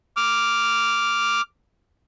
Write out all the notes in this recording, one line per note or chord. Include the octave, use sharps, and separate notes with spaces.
D6 F6